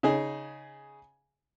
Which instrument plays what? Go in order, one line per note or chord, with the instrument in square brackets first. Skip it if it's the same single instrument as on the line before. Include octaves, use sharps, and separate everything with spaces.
[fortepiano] C#3 D#4 G#4